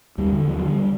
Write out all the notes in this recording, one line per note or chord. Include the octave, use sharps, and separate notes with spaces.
D#2 G3
D3
D#2 F3
F#3
D3 G3